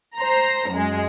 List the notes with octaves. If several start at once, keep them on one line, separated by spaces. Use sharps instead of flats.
C5 A#5
F#2 G#3